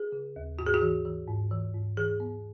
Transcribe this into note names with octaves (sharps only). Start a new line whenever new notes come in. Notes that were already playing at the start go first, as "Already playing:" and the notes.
Already playing: G#4
C#3
D#2
G#2 F#4
G#4
F#4
E3
E3
G#2
E3
G#2
E3 G#4
B3